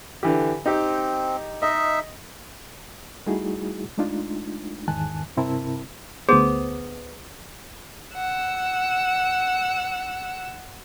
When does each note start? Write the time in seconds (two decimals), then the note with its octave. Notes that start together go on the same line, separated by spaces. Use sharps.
0.23 D3 E3 G4
0.66 C4 D#4 G4
1.62 D#4 D#5 E5
3.26 G3 A3 D#4 E4 F#4 G#4
3.98 G#3 A3 D4 D#4 F4
4.88 E2 G#2 D#3 G#5 A5 F#6
5.37 G2 C3 C4 E4 A#4 A5
6.29 D2 B3 G#4 C5
8.14 F#5 E6